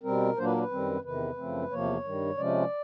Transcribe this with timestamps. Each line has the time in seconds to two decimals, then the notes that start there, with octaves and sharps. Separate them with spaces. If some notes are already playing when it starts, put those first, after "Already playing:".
0.03 B2 G3 C4 A#4
0.37 A#2 F#3 A#3 D4 C5
0.45 B4
0.52 A#4
0.58 B4
0.71 F#2 D#3 G3 C4
1.04 E2 C3 D#3 B4
1.37 F#2 C#3 F3 A3 C4
1.71 E2 C3 F3 A#3 C#5
2.04 G2 D#3 G3
2.37 C3 F3 G#3 C#4 D5